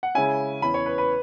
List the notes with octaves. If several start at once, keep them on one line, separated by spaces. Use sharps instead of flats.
F#5
C#3 G#3 C#4 E4 G#5
E2 E3 C#4 B5
C#5
B4
B4